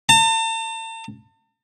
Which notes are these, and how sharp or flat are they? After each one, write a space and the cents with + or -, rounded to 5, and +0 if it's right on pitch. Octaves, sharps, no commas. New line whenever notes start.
A5 +40